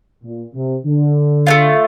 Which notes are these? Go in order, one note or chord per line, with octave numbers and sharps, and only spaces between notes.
A#2
C3
D3
A3 C4 F4